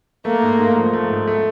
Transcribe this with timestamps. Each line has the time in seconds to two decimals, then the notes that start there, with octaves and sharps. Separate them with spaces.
0.25 A3 A#3
0.42 G#2
0.59 G#2
0.76 F3
0.93 A3
1.10 G#2
1.27 A3